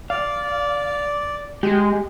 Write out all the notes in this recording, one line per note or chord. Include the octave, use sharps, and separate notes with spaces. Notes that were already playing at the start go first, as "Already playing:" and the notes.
D5 F5
G#3 G4